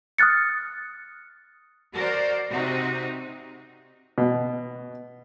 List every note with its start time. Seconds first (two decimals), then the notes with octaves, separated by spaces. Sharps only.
0.18 D#6 F6 F#6 A6 C#7
1.94 F#4 A#4 C5 D5
2.48 C3 C4 D#4 F#4
4.18 B2